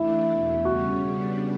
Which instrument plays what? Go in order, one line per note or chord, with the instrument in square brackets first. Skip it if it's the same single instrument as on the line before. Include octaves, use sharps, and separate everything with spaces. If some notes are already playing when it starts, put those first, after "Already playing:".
Already playing: [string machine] E3 A3 D4 [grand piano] E4
[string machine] E2 B2 A3
[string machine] C#3 G3 C#4 [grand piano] F#4
[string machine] C#3 G3 B3 D4